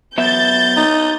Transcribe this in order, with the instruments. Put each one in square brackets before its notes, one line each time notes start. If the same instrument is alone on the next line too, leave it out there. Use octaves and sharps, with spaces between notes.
[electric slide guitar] F#3 B3 E5 [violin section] G6 A6
[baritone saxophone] D#4